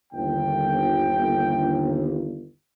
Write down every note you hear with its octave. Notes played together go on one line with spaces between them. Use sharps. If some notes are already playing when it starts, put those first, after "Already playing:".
G1 D#2 G5